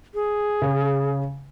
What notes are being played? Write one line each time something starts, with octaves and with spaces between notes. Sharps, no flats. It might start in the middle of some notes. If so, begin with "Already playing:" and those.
G#4
C#3